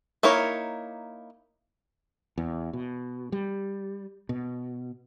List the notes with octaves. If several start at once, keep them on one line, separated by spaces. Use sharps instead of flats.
A#3 D#4 E4 A#4 C#5
E2
B2
G3
B2